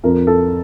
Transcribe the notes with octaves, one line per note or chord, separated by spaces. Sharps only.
F2 A#4
A4